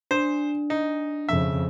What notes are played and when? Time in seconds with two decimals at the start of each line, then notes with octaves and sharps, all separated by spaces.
0.11 D4 C5
0.70 D#4
1.29 F2 C#3 E5